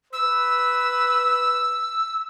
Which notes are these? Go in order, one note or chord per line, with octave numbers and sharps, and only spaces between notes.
B4 E6